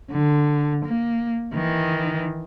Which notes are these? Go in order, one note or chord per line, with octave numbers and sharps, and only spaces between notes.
D3
A#3
D#3 E3